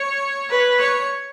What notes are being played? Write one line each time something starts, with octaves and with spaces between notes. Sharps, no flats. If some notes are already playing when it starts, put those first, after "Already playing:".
Already playing: C#5
B4
C#5